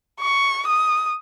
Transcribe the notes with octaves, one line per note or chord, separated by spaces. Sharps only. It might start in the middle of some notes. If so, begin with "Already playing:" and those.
C#6
D#6